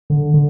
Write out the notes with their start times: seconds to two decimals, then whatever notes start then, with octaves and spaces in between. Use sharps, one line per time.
0.10 D3
0.34 D3